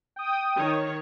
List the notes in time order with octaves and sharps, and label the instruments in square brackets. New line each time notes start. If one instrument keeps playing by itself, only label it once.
[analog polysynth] G5 D#6
[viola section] D#3 C#5